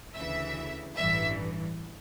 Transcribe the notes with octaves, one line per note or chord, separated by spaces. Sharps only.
D2 C#3 E3 E5
A1 G2 E3 E5